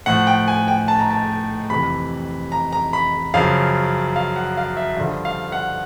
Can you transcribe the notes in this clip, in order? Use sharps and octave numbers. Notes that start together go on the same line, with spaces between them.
A2 F3 F#5
G5
G#5
G5
A5
A#5
A5
F2 C3 E3 B5
A#5
A#5
B5
F#2 C#3 F3 F5
F5
F#5
F5
E5
G2 D3 F3
F5
F#5